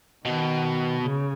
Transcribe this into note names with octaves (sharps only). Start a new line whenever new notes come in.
B2 D#3
C#3